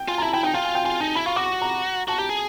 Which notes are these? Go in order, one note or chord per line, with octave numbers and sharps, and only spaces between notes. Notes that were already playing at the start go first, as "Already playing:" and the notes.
Already playing: G5
F4 G#5
A#5
E4 A5
E4 G5
D#4 G5
F4 G5
G#5
G5
F4 G#5
D#4 A5
E4 B5
F4 C#6
F#4 D6
C#6
A#5
F#4 A5
G4 A#5
G#4